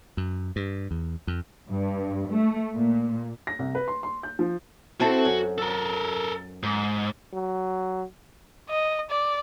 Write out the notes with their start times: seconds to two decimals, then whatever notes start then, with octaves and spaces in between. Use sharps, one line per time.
0.17 F#2
0.56 G2
0.91 E2
1.27 F2
1.69 G2
2.31 A3
2.76 A#2
3.47 A#6
3.59 C2
3.75 B4
3.88 C6
4.03 C6
4.23 G6
4.39 F3
5.00 C4 E4 F#4 A4
5.25 F#2
5.58 A4 A#4
6.63 G#2
7.33 F#3
8.70 D#5
9.10 D5